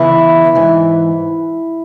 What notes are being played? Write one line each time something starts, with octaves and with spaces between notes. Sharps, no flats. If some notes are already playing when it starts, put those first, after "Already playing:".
Already playing: E2 C#3 E3 E4
G#2 E3